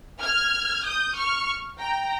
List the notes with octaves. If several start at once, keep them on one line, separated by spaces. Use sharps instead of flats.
F6 G#6
D#6 G6
C#6 F6
G5 A#5